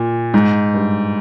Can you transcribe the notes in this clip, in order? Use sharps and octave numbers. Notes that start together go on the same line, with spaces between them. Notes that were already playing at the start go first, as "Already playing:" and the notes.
Already playing: A#2
G#2
G2